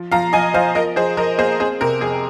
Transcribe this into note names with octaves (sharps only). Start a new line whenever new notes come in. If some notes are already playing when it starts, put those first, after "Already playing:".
Already playing: F3
F3 F5 A#5
F3 D#5 G#5
F3 C5 F5
F3 A#4 D#5
F3 G#4 C5
F3 A#4 D#5
A#3 G#4 C5
C4 G#4 C5
C3 A#4
F2 G#4